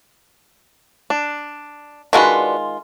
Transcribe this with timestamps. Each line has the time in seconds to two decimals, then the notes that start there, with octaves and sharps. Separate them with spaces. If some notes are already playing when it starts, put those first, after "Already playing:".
1.10 D4
2.13 D#3 G#3 D4 F4 F#4 B4